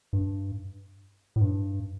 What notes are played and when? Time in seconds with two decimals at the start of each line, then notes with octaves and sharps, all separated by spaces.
0.13 G2
1.36 A2
1.41 G2